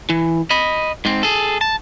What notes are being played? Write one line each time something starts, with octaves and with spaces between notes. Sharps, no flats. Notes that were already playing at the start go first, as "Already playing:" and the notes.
E3
D#5 B5
G#2 C4
G#4 A4
A5